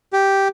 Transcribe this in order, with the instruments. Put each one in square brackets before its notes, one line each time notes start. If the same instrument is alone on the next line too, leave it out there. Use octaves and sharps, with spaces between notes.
[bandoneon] G4